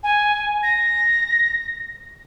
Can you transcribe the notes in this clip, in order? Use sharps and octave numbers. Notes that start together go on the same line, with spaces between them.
G#5
A#6